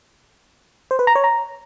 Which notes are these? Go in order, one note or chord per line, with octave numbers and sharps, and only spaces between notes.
C5
B4
A#5
C#5
A#5